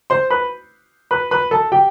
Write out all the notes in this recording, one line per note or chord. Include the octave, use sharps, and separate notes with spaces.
C5 C6
B4 B5
B4 B5
B4 B5
A4 A5
G4 G5